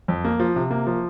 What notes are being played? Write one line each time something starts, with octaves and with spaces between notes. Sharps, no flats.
F2
A#3
F3
C3
A#3
F3